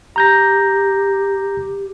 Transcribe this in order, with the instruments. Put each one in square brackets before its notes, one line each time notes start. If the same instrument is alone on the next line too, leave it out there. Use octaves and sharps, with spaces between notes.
[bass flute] G4 [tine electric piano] A#5 G6 A#6